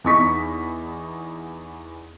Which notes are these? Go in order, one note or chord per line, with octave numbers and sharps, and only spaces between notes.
E2 D#4 C#6 B6